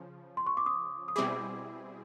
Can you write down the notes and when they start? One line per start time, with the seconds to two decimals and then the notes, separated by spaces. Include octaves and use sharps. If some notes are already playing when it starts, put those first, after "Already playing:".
Already playing: C#3 F3
0.37 C6
0.47 C#6
0.57 D6
0.66 D#6
1.08 D#6
1.16 B2 G3 C4 E4 G#4 D6